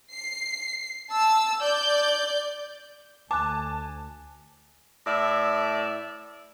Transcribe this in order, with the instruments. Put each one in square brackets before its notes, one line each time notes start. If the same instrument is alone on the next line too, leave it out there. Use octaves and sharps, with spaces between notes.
[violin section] C7
A5 E6
D5 G6
[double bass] D2 [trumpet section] G#5 [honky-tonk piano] A5 [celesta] D6 F#6
[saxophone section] A2 D5 E5